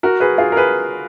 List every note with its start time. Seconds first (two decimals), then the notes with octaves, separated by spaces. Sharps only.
0.03 F#4 A#4
0.20 G#4 B4
0.38 F4 G#4
0.52 A#4
0.56 G#4 B4